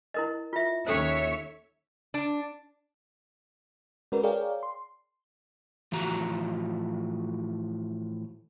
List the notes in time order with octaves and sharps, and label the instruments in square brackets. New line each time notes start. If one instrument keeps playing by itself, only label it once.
[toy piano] E4 A#4 D#5
F4 E5
[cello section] D#2 C#5 E5 [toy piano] C#4 A4 C5
[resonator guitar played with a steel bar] D4
[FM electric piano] G#3 C#4 F#4 A#4 B4 D5
G#4 A#4 C#5 D5 F5 G5
C6
[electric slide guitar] A2 E3 F3 F#4 A#5